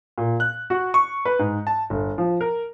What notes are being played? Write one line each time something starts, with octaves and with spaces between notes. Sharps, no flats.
A#2
F#6
F#4
C#6
B4
G#2
A5
G1
F3
A#4